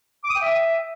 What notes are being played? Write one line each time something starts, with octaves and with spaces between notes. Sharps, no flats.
D6
D#6
G5
E5